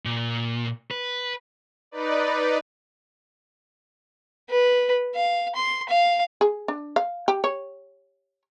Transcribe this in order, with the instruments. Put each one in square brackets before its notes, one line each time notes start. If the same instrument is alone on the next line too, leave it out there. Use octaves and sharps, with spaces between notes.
[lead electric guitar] A#2
B4
[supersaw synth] D#4 B4 D5
[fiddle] B4
F5
C6
F5
[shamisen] G#4
D4
F5
G4
C#5